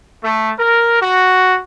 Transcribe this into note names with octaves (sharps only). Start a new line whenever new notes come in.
A3
A#4
F#4